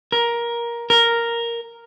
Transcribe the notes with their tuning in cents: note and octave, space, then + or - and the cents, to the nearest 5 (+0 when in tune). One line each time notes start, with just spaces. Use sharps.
A#4 +15
A#4 +0